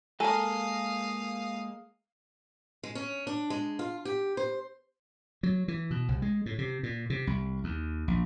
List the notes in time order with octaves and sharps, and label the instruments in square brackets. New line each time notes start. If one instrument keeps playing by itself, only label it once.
[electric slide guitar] G#3 A#3 G#5 [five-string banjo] A4 A#4 [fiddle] F5 D#6
[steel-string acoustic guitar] G#3
C#4
D4
G#3
F4
G4
C5
[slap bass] F#3
E3
B2
C2
G#3
A2
C3
A#2
C3
C2
D#2
A#1